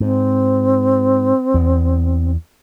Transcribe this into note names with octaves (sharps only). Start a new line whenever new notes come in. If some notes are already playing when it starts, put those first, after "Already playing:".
G#2 C4
E2